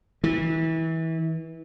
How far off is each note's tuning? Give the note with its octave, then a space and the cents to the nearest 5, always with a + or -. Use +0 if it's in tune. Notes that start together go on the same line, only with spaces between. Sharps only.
E3 -25